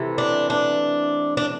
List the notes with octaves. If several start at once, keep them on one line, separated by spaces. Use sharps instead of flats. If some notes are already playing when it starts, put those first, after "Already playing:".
Already playing: C3 E3 A3
D4
D4
D4